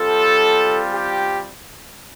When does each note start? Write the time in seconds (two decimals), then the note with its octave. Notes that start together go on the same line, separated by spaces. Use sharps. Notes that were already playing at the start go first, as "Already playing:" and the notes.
Already playing: G3 C4 F4 A4
0.92 G4